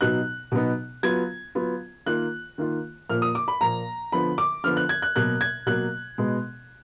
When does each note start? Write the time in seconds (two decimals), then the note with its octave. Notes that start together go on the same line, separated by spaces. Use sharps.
0.01 B2 F#3 B3 D#4 F#6
0.52 B2 F#3 B3 D#4
1.03 F#3 B3 F4 G#6
1.55 F#3 B3 F4
2.06 D#3 A#3 F4 F#6
2.58 D#3 A#3 F4
3.09 A#2 F3 A#3 F6
3.22 D#6
3.35 D6
3.48 B5
3.61 A#2 F3 A#3 A#5
4.12 D3 F3 B3 B5
4.38 D6
4.64 D3 F3 B3 F6
4.77 F#6
4.89 G#6
5.02 F#6
5.15 B2 F#3 A#3 F#6
5.41 G#6
5.66 B2 F#3 A#3 F#6
6.18 B2 G#3 B3